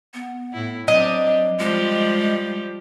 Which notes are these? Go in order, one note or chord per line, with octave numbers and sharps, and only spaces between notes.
B3
A2 E4
F#3 C4 D4 G4 D#5
F3 G3 G#3 G4